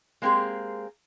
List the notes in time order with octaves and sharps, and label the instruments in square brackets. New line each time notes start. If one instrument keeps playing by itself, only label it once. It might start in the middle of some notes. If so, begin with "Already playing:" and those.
[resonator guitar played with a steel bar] G#3 A#3 C4 G4 G#4